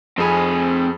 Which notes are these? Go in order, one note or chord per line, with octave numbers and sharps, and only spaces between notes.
F2 C4 G#4 G#5 B5